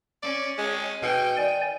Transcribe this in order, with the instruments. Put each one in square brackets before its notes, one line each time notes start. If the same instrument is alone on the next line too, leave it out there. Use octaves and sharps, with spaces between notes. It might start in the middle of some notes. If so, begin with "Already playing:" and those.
[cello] C#4 [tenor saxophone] D5
[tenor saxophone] G#3
[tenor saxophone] B2 [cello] G5
[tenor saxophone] D#3 [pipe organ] D5 G#5